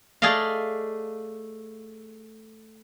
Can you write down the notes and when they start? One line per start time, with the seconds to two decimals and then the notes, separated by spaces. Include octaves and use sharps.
0.22 A3 G#4 D5 D#5 F5